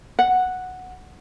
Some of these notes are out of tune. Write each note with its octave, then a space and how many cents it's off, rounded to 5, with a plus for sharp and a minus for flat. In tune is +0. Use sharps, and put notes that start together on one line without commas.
F#5 -5